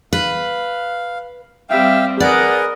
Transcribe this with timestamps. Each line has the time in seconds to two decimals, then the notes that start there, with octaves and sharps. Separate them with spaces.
0.13 B4 F5
1.70 G3 C4 E5 F5 G5
2.20 G#4 A#4 B4 D5 D#5 F#5